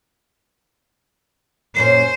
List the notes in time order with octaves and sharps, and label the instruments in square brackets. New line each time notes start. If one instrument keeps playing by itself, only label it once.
[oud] F#2 A#2 C#4 [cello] C5